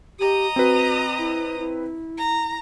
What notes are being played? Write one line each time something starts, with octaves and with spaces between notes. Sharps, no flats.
G4 D#5 A#5 D#6
C4 F#4 B4
E4
E4
A#5